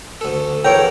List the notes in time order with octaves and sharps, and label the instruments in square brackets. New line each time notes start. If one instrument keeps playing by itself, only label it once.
[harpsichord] D2 A4
[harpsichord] E2 A4 A#5 [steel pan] A#4 C#5 G5